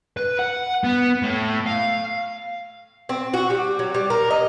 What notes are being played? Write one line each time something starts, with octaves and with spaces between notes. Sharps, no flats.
B4
F#5
B3
A2
F5
C4
F#4
G3
F#3
G3
A#4
D#5